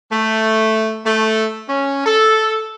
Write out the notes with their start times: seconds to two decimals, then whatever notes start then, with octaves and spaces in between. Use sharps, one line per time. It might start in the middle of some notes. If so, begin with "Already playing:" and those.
0.11 A3
1.05 A3
1.68 C#4
2.06 A4